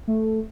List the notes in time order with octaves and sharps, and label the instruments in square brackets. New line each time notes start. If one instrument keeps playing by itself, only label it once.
[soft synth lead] A3